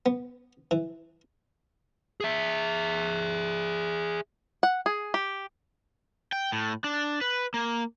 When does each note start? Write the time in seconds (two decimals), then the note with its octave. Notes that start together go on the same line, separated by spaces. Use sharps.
0.06 B3
0.71 E3
2.20 G#4 E5
4.63 F#5
4.86 G#4
5.14 G4
6.32 G5
6.52 A2
6.84 D4
7.21 B4
7.54 A#3